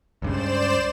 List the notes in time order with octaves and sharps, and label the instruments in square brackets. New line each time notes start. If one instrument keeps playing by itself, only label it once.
[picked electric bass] C#2 G2 C#3 [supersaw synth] C5 D5 E7